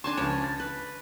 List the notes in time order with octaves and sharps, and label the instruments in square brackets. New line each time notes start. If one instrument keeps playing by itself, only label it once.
[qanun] D4 G#5 A5 [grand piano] C6
[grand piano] C#2 F3 [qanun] C#5
[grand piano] A6
[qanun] B4